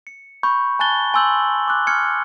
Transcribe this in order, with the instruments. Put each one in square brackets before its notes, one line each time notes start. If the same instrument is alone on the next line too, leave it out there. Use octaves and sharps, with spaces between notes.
[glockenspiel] C#7
B5 C#6 G6
G#5 A5 F#6 A6 G7
G#5 C6 E6 G6 F#7
D6 F#6
F6 G#6 C#7